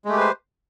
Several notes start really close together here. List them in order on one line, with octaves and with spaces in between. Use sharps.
G#3 A3 G4 B4 C5